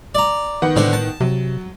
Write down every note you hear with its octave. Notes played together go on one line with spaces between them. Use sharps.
D5 A#5
D#3 B3 F#5
A2 D3 D4 C5
A5
C3 F#3